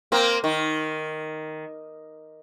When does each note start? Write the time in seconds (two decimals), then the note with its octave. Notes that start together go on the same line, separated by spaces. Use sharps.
0.12 A#3 C4
0.44 D#3